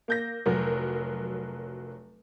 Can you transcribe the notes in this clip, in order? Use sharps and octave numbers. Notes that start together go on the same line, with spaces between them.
A#3 G6 A#6
F1 F#3 A#4